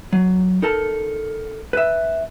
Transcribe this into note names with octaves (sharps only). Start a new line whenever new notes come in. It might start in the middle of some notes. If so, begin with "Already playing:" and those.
F#3
D#4 A4 A#4 A5
B4 E5